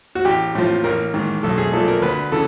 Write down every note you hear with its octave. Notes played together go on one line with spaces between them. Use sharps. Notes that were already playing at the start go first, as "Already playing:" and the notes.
F#4
A1 G4
A2 F3
A1 A#4
G#2 D#3
B1 A4
G#4
A#2 F3 A4
A#4
D2 B4
C#3 E3 A4